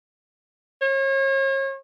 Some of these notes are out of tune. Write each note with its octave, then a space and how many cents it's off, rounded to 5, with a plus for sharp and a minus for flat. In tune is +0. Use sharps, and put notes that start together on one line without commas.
C#5 -40